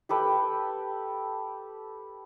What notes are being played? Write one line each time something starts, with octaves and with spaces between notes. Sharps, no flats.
G4 A4 B4 G5